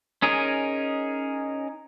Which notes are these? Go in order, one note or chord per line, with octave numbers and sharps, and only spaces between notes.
C#4 D#4 G#4 A#4